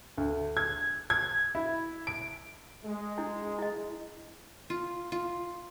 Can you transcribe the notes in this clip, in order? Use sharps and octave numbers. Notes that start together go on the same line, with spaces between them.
D2
G#6
G#6
E4
D7
G#3
D4 E4
E4 D#5
F4
F4